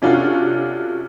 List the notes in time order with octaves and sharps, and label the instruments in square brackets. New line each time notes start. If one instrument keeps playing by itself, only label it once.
[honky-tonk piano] C3 C#4 D4 F4 F#4 A4